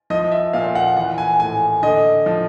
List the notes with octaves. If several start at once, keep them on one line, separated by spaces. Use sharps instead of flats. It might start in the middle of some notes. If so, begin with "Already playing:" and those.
F3 D#5
E5
A#2 F5
F#5
E3 F#5
G#5
A2 G#5
D3 D#5
F3